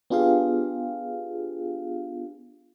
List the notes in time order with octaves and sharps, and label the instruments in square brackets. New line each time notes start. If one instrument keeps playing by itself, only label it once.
[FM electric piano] B3 D4 F4 G4 G#4 F5